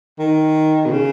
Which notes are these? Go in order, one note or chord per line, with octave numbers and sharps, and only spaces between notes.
D#3
B2
C#3